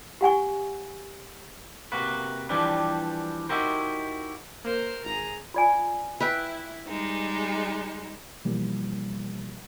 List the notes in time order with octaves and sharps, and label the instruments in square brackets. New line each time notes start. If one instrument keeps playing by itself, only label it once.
[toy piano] G4 F#5 G#5 C#6
[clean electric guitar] C3 A#3 F#4 B4
E3 F3 G3 D4 G4 B4
D#4 E4 F#4 G4 A#4 C5
[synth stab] A#3 [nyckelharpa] A#4 C5
[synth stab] G#1 [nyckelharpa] G#4 A#5
[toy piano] F4 D5 G#5
[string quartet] E4 [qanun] B4 E5 G5
[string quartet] G3 G#3 D#4
[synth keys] B2 E3 F3 G3 A#3